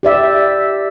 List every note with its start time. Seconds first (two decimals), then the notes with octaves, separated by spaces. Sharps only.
0.03 G4 D5 E5